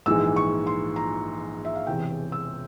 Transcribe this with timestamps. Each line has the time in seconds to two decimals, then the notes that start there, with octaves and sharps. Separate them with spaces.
0.06 A#1 G#2 E3 G#3 E6
0.36 C#6
0.67 C6
0.96 A#5
1.65 E5
1.76 F5
1.87 E1 E2 C3 E3 G5
2.32 E6